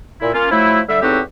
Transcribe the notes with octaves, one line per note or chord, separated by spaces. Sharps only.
A#2 E4
A#3 C#4 F4
F3 F#3 A3 E4
D3 G3 E5
E2 A2 C4 D#4 F#4 G4